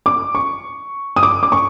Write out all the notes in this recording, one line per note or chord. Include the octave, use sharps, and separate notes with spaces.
D6
C#6
D#6
D6
D6
C#6